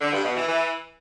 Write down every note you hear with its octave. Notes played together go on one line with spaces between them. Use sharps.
D3
G2
B2
E3
E3